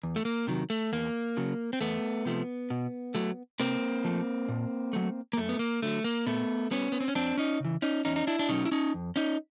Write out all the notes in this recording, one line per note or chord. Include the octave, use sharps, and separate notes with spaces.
E2
A3
A#3
C3 D#3 F#3
A3
E2 A#3
C#3 F#3
C4
E2 A3 B3
C3 F3 A3
B2
F#3 A3
C3 A#3 C4
F3 A3
A#2
F#3 A3
A#3
F#2 A3
B3
A#3
D3 F#3 A3
A#3
A#2 A3 B3
G3 B3 C#4
B3
C4
C#4
F2 C4 D4
C#4 D#4
C#3 E3
C#4 D#4
E2 C#4 D#4
D#4
D4 E4
D4
B2 F#3 A3 C#4 D#4
E4
C#4 D#4
F2
C#4 D#4